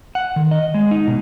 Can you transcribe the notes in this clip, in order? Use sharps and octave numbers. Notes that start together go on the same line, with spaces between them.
F#5
D#3
D#5
G#3
D#4
B2